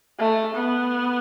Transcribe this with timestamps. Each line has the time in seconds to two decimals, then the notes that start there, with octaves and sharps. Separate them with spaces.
0.19 A3
0.55 B3